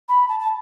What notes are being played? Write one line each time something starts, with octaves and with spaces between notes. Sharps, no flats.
B5
A5
A5